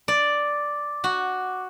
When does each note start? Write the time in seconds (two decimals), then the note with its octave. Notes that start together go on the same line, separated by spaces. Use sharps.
0.08 D5 D6
1.04 F#4